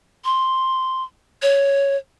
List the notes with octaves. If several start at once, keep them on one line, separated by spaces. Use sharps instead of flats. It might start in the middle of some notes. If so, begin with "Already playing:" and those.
C6
C#5